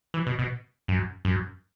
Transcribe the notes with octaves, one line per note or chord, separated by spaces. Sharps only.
E3
B2
B2
F#2
F#2